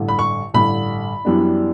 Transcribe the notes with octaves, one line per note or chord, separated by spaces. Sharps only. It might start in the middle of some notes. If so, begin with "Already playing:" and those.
Already playing: A1 G2 D3
B5
C#6
A1 G2 D3 B5
F#2 E3 G3 B3 D4